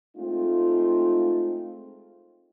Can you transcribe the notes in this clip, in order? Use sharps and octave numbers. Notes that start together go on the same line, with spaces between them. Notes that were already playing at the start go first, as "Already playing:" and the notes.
G#3 A3 C4 D#4 F4